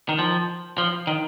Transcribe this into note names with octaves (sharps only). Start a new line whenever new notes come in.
D#3
F3
F3
D#3